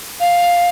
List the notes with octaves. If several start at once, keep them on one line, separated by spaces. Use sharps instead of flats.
F5